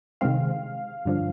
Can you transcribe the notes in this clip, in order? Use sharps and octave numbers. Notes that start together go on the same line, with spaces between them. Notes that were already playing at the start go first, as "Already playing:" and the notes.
C3 D#3 G#3 C4 F5
G2 D3 F3